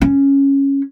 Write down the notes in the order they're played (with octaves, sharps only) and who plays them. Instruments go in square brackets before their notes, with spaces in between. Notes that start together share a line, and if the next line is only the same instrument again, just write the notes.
[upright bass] C#4